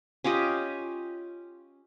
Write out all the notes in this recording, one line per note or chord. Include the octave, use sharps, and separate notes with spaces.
C#4 F4 G4 D#5